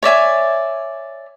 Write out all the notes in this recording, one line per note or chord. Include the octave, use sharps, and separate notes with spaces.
C#5 D5 E5 G#5